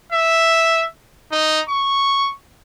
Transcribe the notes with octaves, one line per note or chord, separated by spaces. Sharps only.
E5
D#4
C#6